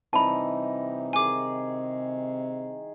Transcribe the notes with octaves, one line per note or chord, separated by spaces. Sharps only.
C3 E3 G3 D#4 A5 B5
D#3 G#4 G#5 C#6 D6